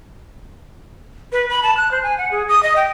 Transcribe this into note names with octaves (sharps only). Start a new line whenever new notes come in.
B4
B5
A5
F#6
C5
G#5
F#5
G#4
D#6
D#5
G5